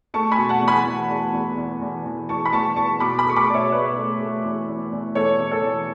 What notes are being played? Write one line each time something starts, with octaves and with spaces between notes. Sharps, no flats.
A3 A5 C#6
G#5 B5
B2
F#5 A5
E2
G#5 B5
E2
E2
E2
E2
E2
E2
E2 A5 C#6
B5
E2 A5 C#6
E2 A5 C#6
B2 B5 D6
B5 D6
A3 C#6
B5 D6
B2 D5
C#5 E5
B2 B4 D5
A3
A3
E2
E2
E2
E2 A4 C#5
E2
A4 C#5
E2